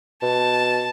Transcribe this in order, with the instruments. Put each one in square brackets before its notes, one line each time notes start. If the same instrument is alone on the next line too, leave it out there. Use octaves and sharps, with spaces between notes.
[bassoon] B2 [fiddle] A5